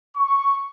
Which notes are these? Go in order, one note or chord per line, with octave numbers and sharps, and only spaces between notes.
C#6